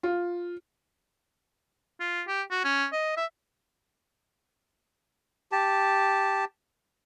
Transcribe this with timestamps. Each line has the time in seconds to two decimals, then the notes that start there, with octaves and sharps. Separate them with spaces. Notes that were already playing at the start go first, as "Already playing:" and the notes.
0.03 F4
2.00 F4
2.28 G4
2.51 F#4
2.64 C#4
2.92 D#5
3.17 E5
5.52 G4 A5